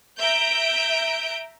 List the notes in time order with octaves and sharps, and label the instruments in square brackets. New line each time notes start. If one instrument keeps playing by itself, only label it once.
[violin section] E5 A#5 G6 D7